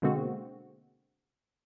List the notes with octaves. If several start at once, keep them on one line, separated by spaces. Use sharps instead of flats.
B2 D3 G#3 A#3 C4 F#4